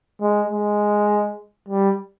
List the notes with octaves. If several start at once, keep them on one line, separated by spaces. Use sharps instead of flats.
G#3
G#3
G3